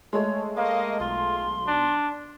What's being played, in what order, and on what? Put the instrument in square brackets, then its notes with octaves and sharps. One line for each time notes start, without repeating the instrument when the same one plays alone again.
[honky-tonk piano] G#3 A3 [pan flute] C#5
[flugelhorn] A#3 [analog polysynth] D#5 [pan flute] F5
[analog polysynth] B1 [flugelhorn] F4 [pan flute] C6
[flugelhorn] D4